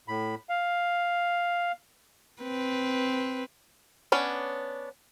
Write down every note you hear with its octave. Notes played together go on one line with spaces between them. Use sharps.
A2 B5
F5
C4 B4
B3 C#4 D4